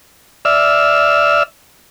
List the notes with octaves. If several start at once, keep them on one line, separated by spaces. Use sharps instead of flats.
D5 E5 E6 F6